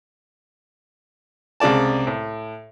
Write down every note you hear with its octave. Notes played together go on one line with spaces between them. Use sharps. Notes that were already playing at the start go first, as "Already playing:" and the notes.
C2 C#3 G#3 D5 A5
A2